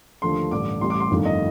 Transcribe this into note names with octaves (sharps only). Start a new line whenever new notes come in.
D#2 D3 F3 A3 C6
A1 G2 D3 D6
A1 A2 G3 C6
D6
C6
G1 F2 D#3 A3
D#5